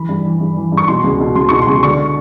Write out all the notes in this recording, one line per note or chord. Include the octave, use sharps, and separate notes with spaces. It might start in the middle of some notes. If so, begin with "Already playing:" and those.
Already playing: E3 B5
G2
E3
G2
E3
G2
C#6
B2 C6
C#2
B2
C#2 C6
B2 C#6
C6
C#2
D3 C#6